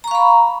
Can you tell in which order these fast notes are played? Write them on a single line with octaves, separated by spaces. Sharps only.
A#5 C#6 F5 B5